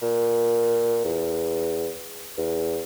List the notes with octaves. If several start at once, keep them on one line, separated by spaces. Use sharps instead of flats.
A#2
E2
E2